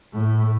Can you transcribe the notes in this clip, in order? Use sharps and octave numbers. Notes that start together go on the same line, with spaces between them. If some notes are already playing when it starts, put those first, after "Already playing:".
A2